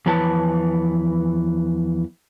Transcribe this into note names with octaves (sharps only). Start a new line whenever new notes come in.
E2 E3 F3 B4 C#5 A5